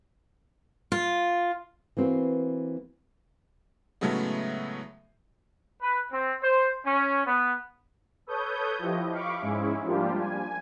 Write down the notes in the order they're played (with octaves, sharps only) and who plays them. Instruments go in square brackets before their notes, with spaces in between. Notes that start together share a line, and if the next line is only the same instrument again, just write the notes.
[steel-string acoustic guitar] F4
[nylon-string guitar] E3 A#3 C4 F#4
[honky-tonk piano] A2 C#3 F#3 G#3 A3 B3
[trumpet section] B4
C4
C5
C#4
B3
[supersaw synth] A4 B4 C#5 D#6 G6
F3 E4 G4 D#5
F5 B5 C#6 D6
G#2 G#3 C#4 E4
F3 G3 A#3 D4 F4 G4
G#5